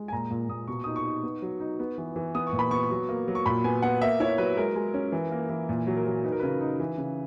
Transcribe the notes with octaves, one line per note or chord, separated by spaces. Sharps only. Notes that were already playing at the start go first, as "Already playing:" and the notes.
Already playing: G#3
G#5
A#2 A#5
A#2
A#2 D#6
B2 C#6
D#4 D#6
C#6
D#4
B3
F#3
D#4
B3
E3
E3
B3 D#6
C#6
A#2
B5
B3 C#6
F#3
A#3
F#3
C#6
A#2 B5
B3 G#5
B3 F#5
A#3 E5
E4 C#5
F#3 B4
G#3 A#4
G#3
C#4
E3
A#3
E3
A#2
F#3
A#4
F#3
D#4 B4
A#4
C#3 B4
D#4
E3
C#3